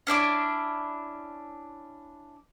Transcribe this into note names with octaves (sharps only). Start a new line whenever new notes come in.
C#4 D4 E4 D6